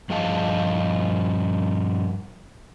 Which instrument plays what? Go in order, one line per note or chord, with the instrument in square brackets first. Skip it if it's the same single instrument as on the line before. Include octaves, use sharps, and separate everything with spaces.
[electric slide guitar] G2 F3 G#4 D#5 F5 A5